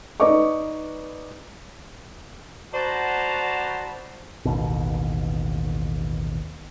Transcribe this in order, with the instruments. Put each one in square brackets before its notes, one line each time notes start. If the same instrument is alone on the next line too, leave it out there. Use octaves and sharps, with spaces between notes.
[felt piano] D#4 B4 D5 D#5 C#6 D6
[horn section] B3 F#4 C5 D5 A5 A#5
[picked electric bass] A1 D#2 B2